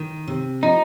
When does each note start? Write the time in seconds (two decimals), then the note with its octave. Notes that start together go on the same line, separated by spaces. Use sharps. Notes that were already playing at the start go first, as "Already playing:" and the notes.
Already playing: D#3
0.27 C3
0.63 F3 D#4